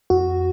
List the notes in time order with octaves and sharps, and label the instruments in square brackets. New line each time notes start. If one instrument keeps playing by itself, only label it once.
[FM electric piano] F2 F#4